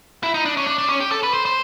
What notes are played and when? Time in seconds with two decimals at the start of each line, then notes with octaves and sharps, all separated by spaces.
0.23 E4
0.34 D#4
0.45 D4
0.57 C#4
0.67 D4
0.78 D4
0.89 C#4
1.00 G4
1.11 A4
1.23 B4
1.34 C5
1.45 C5